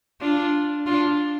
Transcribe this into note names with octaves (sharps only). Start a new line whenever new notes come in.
D4 F4
D4 F4